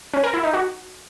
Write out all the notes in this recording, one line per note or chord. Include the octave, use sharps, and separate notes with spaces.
C#4
A#4
E4
D#4
F#4